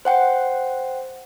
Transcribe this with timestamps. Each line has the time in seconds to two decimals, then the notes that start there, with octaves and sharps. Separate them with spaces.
0.05 C5 F#5 G5